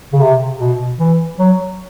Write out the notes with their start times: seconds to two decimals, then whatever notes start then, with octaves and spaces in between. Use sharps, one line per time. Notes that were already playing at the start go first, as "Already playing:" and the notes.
0.13 C#3
0.21 C3
0.60 B2
0.99 E3
1.39 F#3